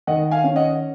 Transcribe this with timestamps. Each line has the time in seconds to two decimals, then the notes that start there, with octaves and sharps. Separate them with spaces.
0.07 D#3 D#5 F#5
0.31 F5 G#5
0.44 C#4
0.56 D#5 F#5